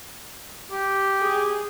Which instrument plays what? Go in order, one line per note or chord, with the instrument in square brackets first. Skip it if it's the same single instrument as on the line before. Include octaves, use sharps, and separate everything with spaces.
[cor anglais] G4
[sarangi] G#4